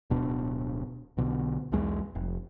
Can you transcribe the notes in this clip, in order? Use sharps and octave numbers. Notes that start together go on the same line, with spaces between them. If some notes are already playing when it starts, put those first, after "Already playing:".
D1 B2 D4
B1 B2 D3
B1 E2 G#3
F1